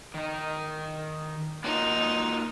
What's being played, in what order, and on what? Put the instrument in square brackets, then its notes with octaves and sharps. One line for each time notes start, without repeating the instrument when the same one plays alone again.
[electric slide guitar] D#3 D#4
[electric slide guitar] A#3 F4 F#4 [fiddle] D#4